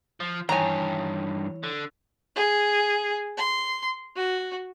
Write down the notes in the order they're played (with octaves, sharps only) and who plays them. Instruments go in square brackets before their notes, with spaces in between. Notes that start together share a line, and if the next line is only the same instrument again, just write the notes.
[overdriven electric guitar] F3
[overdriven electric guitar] G2 D#3 [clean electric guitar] E3 C#5 [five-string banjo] G#5 A#5
[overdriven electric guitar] D3
[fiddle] G#4
C6
F#4